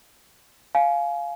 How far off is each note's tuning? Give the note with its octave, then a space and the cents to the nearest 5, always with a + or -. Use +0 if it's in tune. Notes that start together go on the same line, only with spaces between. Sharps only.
F5 +0 G#5 +25